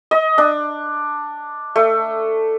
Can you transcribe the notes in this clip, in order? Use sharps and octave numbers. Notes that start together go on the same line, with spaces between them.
D#5
D4
A3